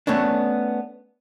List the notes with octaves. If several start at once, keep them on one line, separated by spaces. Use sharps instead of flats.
A3 B3 C#4 D4